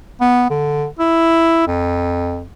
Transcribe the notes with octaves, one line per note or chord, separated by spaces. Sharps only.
B3
D3
E4
F2